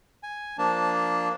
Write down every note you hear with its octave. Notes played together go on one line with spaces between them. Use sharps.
G#5
F3 A#3 D4 A5